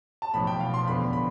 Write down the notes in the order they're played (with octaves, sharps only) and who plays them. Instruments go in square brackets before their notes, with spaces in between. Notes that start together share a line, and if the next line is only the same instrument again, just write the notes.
[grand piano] A5
B1 A2 F3 B5
G5
F5
C6
E2 D3 F3 B5
B5